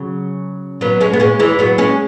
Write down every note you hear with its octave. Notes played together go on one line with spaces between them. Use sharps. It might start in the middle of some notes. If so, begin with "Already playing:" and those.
Already playing: C#3 F#3
F#3 B3
G#3 C#4
B3
G#3 C#4
E3 G#3
F#3 B3
G#3 C#4